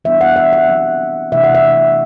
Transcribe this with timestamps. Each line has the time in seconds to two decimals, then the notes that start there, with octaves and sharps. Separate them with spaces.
0.05 E3 G3 B3 D4 E5
0.21 F#5
0.36 E5
0.53 F#5
0.68 F#3 C4
1.32 C3 E3 A3 D4 E5
1.44 F#5
1.55 E5